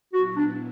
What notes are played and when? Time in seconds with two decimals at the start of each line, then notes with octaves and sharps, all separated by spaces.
0.13 A#2 F#3 B3 E4 F#4
0.36 D4